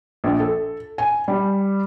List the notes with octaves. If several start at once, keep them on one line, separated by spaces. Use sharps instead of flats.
A#1
A4
G#5
G3